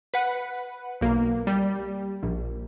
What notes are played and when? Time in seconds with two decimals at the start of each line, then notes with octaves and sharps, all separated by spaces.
0.14 B4 F#5
1.01 B1 A#3
1.47 G3
2.23 A#1